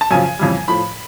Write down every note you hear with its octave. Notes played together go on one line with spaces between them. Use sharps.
A5
F#2 C#3 F3 G#5
F2 C#3 E3 G3
A2 F3 B5